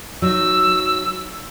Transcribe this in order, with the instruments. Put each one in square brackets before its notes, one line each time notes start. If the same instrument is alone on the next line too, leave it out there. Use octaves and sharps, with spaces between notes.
[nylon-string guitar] F#3 D#4 [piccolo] E6